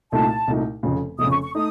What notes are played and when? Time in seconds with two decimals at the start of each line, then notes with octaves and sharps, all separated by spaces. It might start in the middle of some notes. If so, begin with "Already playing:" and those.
0.12 C2 A#2 A3 D#4 A5
0.48 C2 A#2 A3 D#4
0.83 F1 F2 C#3
1.19 F1 F2 C#3 D#6
1.31 C#6
1.43 C#6
1.55 A3 D#4 D#6